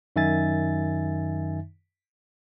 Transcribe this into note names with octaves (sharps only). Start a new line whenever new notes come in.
F#2 D#3 D#4 E5 G#5 A6